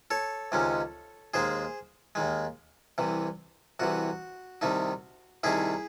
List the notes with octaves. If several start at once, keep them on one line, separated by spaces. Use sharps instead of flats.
A4 C#5
C#2 C3 D#3 G#3 C#4
D#2 D#3 G#3 G#4 C5
D#2 D#3 G#3
C2 C3 E3
C2 C3 E3 F#4
C2 C3 D#3 A3 D#4
C2 C3 D#3 A3 D#4 E4 G#4